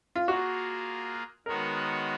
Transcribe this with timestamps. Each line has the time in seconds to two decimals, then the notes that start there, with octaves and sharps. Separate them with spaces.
0.16 F4
0.28 A#3 F4 F#4 G#4
1.46 D#3 G#3 B3 F#4 A#4 C#5